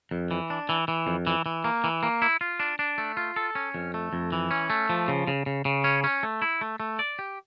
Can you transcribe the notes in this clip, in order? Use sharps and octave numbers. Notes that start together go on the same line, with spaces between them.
F2
E3
D4
E3
E3
F2
E3
E3
A#3
E3
A#3
E4
F4
D4
D4
A3
F4
A4
C#4
F2
A3
F2
E3
C#4
A3
F3
C#3
C#3
C#3
C#3
C#4
C#4
A3
E4
A3
A3
D5
G4